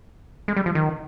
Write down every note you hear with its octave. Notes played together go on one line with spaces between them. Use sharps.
G#3
G3
F3
D#3